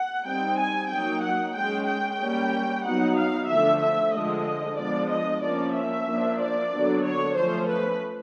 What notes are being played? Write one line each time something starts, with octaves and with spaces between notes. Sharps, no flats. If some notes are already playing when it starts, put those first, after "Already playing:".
Already playing: F#5
G3 C4 D#4 G5
G#5
F#3 A#3 D#4 G5
F#5
G#3 C#4 G5
G5
G3 A#3 C#4
F#3 B3 D#4 F#5
F5
D3 F3 A3 E5
E5
D3 F3 G#3 D#5
F3 G#3 B3 D4 D5
D#5
F3 A#3 C#4 D5
E5
F3 A#3 D4
D5
D3 F#3 B3 D4
C#5
F3 A3 C#4 C5
B4